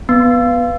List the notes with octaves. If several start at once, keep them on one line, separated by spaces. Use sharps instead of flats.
B3